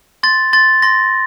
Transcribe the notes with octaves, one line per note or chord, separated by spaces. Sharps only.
C6 A6
C6 A6
C6 A#6